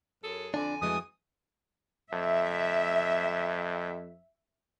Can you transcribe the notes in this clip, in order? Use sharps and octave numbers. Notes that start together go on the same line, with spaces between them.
F#2 G#4 A4
F2 D3 D4 D5 G#5
F2 E3 G#3 A3 F#4 D#6
F2 E5